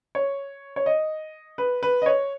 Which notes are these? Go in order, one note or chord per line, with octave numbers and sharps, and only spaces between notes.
C#5
C#5
D#5
B4
B4
D#5
C#5